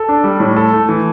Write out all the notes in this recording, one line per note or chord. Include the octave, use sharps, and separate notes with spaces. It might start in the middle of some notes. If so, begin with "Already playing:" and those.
Already playing: A4
D4
G3
A2
A4
A3
E3